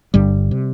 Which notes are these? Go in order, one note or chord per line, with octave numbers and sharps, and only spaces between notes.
G1 G2 D3 G3
C3